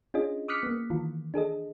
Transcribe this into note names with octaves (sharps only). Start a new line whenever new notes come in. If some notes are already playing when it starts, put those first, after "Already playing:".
C#4 D4 F4 G#4 D#5
D6 D#6 F6 F#6 B6 C#7
A#3 B3
D#3 E3 F4
D4 G#4 A4 D#5